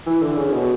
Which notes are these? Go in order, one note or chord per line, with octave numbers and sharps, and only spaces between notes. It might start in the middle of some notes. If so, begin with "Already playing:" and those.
E3
D3
C#3
B2